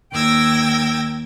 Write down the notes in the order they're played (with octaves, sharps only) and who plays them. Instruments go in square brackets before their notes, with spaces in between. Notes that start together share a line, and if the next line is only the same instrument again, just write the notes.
[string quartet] D#2 G5 E6 G#6 A#6